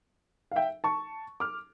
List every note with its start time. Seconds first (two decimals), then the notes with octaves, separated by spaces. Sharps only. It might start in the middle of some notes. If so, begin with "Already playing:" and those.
0.51 F5
0.56 E5 G5
0.84 A5 C#6
1.40 D6 F6